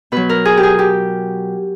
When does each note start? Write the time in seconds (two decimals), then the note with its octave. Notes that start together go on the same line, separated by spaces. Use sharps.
0.12 B2 F#3 B4
0.29 A#4
0.45 G#4
0.57 G4
0.63 G#4
0.79 G4